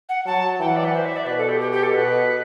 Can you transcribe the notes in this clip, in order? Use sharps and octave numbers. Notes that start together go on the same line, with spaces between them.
F#5
F#3 A5
E3 G5
F#5
D5
B4
C5
E5
D5
B2 B4
A4
G4
G4
G4
A4
B2 B4